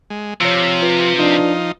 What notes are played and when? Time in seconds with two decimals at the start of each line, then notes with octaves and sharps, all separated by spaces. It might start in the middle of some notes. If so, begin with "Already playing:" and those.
0.10 G#3
0.41 C3 F3 C#5 E6
0.82 F4 B4
1.18 F3 D4 D#4